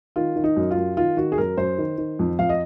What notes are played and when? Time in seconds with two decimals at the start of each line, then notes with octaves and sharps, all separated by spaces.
0.16 D#3 F4
0.36 D#3
0.44 D#4
0.56 F#2
0.71 F4
0.77 F#2
0.97 D#3 F4
1.17 D#3 F#4
1.32 G#4
1.38 F#2 A#4
1.57 F#2 C5
1.78 D#3
1.98 D#3
2.19 F2
2.39 F2 F5
2.49 D#5